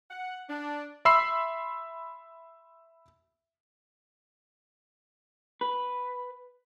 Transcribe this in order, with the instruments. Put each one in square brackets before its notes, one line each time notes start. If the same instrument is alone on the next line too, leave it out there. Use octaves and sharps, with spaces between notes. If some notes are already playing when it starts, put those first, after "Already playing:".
[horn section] F#5
D4
[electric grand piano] E5 B5 C6 E6 C7
[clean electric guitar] B4